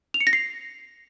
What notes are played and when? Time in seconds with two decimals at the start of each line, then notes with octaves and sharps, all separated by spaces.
0.14 F7
0.21 C#7
0.27 A#6
0.33 C7